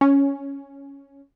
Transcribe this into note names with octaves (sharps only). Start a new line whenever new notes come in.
C#4